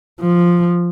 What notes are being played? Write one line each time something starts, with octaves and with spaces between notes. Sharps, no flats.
F3